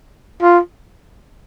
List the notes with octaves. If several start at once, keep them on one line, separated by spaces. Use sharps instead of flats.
F4